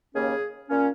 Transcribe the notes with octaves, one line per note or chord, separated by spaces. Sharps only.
D#2 C#3 A#3 C#4 G#4
A#2 A#3 C#4